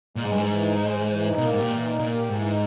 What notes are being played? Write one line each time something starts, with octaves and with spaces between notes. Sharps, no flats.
A#2 G#3
G#2
G2 E3
G#2
E3
D#4
G#3
E3
E3
D#4
B2 A#3
A#2
G#2 G4
A#2
E3
D#4
A#2 A#3
G4
G#2 E3
D#4